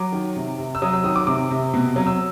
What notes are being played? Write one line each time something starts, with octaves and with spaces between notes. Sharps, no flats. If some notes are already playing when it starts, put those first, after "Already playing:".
Already playing: F#3 D6
D#3
C3
C3
E6
F#3 D#6
E6
D#3 D#6
D6
C3 D6
C3
B2
F#3
E6